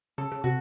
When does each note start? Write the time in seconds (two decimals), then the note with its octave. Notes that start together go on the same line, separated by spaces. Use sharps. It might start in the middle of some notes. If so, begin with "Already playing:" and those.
0.18 C#3 A4
0.32 C#3
0.44 C3 F#4